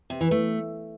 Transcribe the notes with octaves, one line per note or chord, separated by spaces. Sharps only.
C3
E3
A3